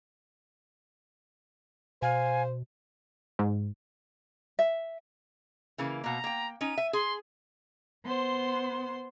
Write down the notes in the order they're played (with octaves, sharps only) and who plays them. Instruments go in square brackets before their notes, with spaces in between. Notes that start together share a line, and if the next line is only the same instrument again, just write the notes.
[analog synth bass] B2 [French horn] C5 [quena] F5 [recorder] G#5
[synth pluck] G#2
[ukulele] E5
[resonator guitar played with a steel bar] C#3 E3 A#3
[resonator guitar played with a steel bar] B2 A#3 [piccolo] A#5
[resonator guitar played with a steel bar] A#3 G5
[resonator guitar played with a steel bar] C#4 D#4 [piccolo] D#7
[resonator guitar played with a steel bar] E5
[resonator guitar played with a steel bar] G#4 [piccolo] C6
[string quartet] B3 C5 C6